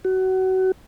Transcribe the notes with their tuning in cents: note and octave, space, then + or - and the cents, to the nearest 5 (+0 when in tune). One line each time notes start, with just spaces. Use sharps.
F#4 +25